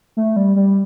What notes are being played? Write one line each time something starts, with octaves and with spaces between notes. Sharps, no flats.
A3
G3
G3